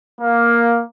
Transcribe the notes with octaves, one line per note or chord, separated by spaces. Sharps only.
A#3